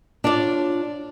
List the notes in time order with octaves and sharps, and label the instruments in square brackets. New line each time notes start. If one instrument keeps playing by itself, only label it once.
[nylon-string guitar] D4 F4 C#5 D5